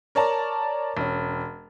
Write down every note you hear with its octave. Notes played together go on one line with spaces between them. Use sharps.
A#4 C#5 D5 A5 A#5
E1 C#4